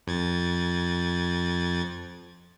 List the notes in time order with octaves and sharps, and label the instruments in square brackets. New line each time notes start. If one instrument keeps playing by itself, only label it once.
[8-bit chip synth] F2 G#6 A6